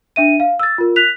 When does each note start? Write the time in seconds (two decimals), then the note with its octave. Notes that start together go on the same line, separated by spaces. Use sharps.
0.16 D4 E5 D#7
0.40 F5
0.59 E6 A6
0.78 F4 A#4
0.96 F#6 B6 F7